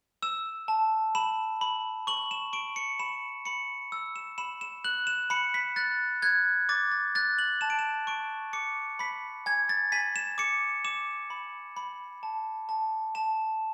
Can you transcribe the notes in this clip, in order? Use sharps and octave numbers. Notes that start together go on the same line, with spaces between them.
E6 E7
A5
B5 E7
B5
C#6 F#7
E7
C#6 D7
C#7
B5 E7
B5 C#7
E6
E7
B5 E7
E7
F#6 F#7
E7
B5 C#7
B6
F#6 A6
F#6 G#6
D6 A6
A6
F#6 A6
F#7
A5 E7
D7
E7
C#6 D7
D6 C#7
B5 B6
G#5 G#6
A6
G#5 B6
E7
D6 C#7
D6 E7
B5
B5
A5
A5
A5 E7